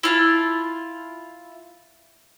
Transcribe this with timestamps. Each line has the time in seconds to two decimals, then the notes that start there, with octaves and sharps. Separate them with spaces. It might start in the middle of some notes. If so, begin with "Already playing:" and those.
0.03 E4 F4 A5